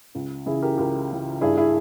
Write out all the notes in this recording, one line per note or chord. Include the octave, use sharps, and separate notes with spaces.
C#2
C#3 E3 E4 G#4
G4 A#4
C#2 G4 A#4
C#3 E3
G2 E4 G#4
E4 G#4